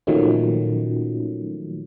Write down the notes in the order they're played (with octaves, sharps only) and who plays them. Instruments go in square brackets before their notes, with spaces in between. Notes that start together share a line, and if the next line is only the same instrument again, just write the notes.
[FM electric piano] A#2 D#3 F3 F#3 A3 C#4